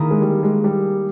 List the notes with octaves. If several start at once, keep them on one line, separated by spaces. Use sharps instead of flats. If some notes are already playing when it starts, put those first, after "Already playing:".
Already playing: D#3 A#3 E4 G#4
G#3
G3
G#3
G3